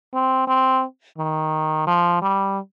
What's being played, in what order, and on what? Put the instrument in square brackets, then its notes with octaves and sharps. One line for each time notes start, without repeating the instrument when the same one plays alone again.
[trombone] C4
C4
D#3
F3
G3